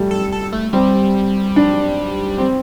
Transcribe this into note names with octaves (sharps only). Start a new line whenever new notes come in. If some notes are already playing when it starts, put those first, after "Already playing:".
Already playing: G3 A3
A4
A4
A3
G3 C4
D4
C4